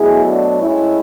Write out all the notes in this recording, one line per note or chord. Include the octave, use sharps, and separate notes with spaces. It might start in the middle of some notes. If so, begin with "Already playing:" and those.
Already playing: B2 F#3 A3 E4 G#4
D4 F#4
A2 G#3 C#4 E4